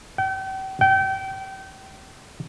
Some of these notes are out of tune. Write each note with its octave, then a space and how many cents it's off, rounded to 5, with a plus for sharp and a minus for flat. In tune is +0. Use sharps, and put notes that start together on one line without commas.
G5 -40
G5 -30